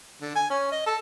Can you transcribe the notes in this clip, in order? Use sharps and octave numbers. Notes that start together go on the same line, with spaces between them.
D3
G#5
C#4
D#5
A4